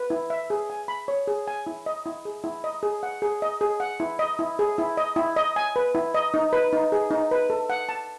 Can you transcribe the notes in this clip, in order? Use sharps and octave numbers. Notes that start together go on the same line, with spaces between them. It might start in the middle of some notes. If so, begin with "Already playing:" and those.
Already playing: B4
E4
E5
G#4
G#5
B5
C#5
G#4
G#5
E4
D#5
E4
G#4
E4
D#5
G#4
F#5
G#4
D#5
G#4
F#5
E4
D#5
E4
G#4
E4
D#5
E4
D#5
G#5
B4
E4
D#5
D#4
B4
D#4
G#4
D#4
B4
A4
F#5
A5